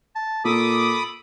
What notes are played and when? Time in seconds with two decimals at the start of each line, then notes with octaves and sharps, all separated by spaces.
0.15 A5
0.45 A#2 A4 B5 D6 D#6